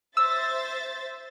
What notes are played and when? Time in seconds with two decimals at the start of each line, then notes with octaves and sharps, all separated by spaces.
0.17 C5 E5 E6 A6